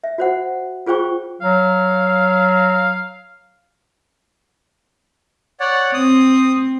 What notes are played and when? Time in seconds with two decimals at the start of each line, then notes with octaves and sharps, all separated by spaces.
0.04 E5
0.18 F#4 C5 F#5
0.87 F4 G#4 C5 G5 C#6
1.41 F#3 F5
5.60 C#5 D5 F#5
5.94 C4 D#6